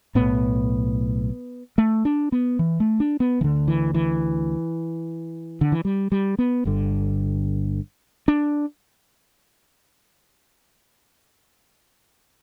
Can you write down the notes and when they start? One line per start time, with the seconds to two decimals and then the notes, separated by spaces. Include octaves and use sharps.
0.15 B1 A2 B3
1.78 A3
2.05 D4
2.32 B3
2.59 E3
2.80 A3
3.00 D4
3.20 B3
3.41 D2 D3 E3
3.68 E3
3.94 E3
5.61 D3
5.72 E3
5.85 G3
6.12 G3
6.39 B3
6.65 G1 G2 D3
8.28 D4